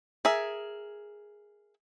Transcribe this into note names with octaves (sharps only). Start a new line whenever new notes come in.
G#4 A#4 E5